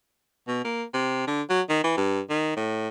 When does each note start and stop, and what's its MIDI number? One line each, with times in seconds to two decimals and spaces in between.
0.48 0.63 47
0.65 0.84 58
0.94 1.26 48
1.27 1.42 50
1.50 1.61 54
1.69 1.80 51
1.84 1.94 52
1.97 2.21 43
2.30 2.56 51
2.57 2.89 45